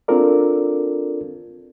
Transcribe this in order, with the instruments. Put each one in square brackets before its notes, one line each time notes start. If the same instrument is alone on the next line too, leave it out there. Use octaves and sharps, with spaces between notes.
[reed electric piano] C4 D4 F4 A4 A#4 D5